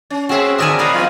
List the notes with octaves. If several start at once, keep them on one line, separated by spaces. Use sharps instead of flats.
C#4
A#3 C4 C#4 F#4 G#4 E5
F2 D3 A#4 D5 E5 G#5 D#6
A#2 F#4 D#5 F5 B5 D#6
F3 B3 F4